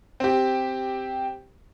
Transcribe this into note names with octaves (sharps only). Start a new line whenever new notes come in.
C4 G4